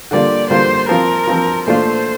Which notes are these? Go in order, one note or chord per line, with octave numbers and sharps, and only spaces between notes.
D3 G3 A#3 F4 D5
D3 G3 A#3 F4 C5
F3 C4 F4 A#4
F3 C4 F4
A#2 A3 D4 F4 C5